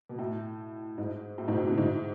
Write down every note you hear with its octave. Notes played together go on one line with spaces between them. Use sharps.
B2
A2
G#2
A2
G#2 B2
A2 C3
B2 D3
G#2